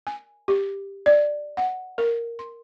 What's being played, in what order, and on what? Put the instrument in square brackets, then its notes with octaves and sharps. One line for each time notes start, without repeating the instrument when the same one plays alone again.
[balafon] G#5
G4
D5
F#5
A#4
C6